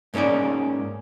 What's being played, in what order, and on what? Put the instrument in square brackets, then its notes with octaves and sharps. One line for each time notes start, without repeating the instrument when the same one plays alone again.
[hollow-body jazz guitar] G#2 A#3 C#4 D#4 D5